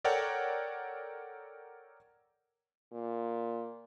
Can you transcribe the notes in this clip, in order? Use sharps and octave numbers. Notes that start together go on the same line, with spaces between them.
A4 A#4 C#5 D5 F#5 G5
A#2